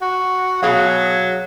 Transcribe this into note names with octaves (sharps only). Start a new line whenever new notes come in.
F#4
B2 F#3 G#4 F5